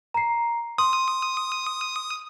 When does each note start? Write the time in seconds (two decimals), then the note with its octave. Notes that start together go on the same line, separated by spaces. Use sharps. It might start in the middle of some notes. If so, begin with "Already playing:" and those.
0.14 A#5 C7
0.78 C6 D#6